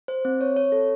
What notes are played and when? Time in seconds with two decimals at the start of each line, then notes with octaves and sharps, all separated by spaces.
0.08 C5
0.25 C4
0.41 C#5
0.57 C#5
0.72 A4